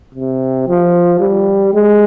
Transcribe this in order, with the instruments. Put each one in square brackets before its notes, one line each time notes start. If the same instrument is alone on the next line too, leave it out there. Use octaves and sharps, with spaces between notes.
[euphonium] C3
F3
G3
G#3